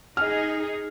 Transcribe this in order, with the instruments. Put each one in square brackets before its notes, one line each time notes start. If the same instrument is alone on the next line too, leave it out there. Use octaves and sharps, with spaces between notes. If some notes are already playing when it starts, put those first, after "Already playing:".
[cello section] D#4 G#4 [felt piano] F6